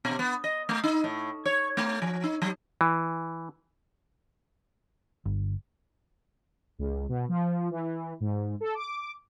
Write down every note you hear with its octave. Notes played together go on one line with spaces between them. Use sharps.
B2
B3
D#5
A3
D#4
A2
C#5
A3
F3
D#4
F#3
E3
G1
C#2
B2
F3
E3
G#2
A4
D6